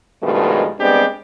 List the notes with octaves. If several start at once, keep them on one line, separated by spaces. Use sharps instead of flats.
G2 B2 D#3 F3 G#3 A3
G3 G#3 B3 C4 D4 G4